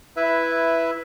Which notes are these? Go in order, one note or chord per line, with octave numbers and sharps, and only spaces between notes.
E4 B4 E5